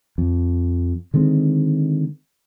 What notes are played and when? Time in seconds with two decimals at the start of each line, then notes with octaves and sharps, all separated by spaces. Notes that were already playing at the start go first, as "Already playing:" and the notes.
0.18 F2
1.14 D3 D#3 G#3 C4